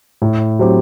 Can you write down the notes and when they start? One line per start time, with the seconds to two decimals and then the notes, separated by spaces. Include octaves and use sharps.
0.22 A2
0.59 F#3 C4 G4